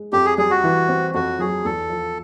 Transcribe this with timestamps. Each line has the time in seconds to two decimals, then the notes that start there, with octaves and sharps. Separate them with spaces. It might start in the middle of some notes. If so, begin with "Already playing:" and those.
Already playing: G#3
0.13 F2 G4
0.25 G#4
0.38 G3 G#4
0.51 F#4
0.64 E3
0.89 C4
1.14 F2 F#4
1.39 F#3 G#4
1.65 E2 A4
1.90 F3